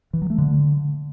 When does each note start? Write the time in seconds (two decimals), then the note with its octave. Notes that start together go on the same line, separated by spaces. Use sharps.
0.13 E3
0.22 F#3
0.30 A3
0.38 D3